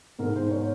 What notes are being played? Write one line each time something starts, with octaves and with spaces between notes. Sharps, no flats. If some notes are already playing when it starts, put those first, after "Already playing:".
G#2 A#4
G#2 C5
C#5